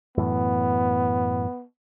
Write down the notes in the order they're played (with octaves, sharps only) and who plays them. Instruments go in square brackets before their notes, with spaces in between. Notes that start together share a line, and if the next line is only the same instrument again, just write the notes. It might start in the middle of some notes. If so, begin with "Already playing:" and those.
[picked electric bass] F#2 A2 E3 [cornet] B3